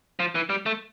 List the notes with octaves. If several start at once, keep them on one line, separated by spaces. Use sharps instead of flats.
F3
E3
G3
A3